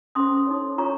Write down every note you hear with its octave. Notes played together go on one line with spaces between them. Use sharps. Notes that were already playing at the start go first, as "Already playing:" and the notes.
C#4 A4 C5 C6 D#6
D#4 A4 C#5
F4 A4 C#5 A#5 C#6